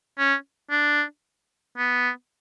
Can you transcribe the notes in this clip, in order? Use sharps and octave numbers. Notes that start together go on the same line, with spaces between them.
C#4
D4
B3